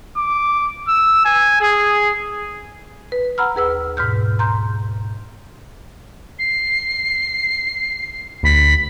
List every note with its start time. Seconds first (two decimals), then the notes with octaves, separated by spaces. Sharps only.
0.17 D6
0.88 E6
1.25 G#5
1.61 G#4
3.12 B4
3.38 F#5 A#5 B5 E6 F6
3.55 D#2 G#4 B4 E6
3.97 G#2 B2 F6 G6
4.39 A#5 C6 G6
6.38 C7
8.43 D2 B5